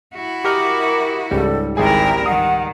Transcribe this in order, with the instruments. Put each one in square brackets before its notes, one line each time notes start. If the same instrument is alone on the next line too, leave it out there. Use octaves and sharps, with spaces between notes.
[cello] E4 F#4
[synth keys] G4 A#4 D#5 [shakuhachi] D6
[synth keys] C#2 G#2 G3 [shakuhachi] A4
[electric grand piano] G#1 G#4 G#5 [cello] E4 A#4 [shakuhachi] G5
[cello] D#3 [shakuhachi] F#5 [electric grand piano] D#6